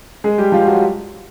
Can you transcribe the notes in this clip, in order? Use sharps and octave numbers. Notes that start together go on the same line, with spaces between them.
G#3 G#4
G3 G4
F3 F4
F#3 F#4